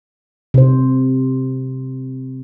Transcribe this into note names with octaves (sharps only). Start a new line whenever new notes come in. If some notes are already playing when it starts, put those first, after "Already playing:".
C3 C5